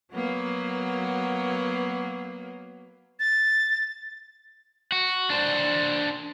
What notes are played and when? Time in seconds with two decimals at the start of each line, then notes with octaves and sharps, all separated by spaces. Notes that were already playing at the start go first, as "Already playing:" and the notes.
0.12 F#3 A#3 B3
3.20 A6
4.92 F#4
5.30 D4 C5